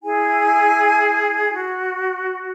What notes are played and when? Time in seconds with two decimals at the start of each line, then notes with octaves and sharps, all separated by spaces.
0.03 E4 G#4 G#5
1.54 F#4